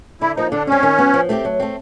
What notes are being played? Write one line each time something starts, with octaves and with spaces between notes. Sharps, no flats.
D3 E4
F3 A#3 D#4
D3 D4
G3 C4 C#4
D#3
F#3 B3
F3
A3 C4 E4 G4
F#3
A3 C4